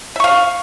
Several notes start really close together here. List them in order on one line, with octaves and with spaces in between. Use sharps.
E5 C#6 F5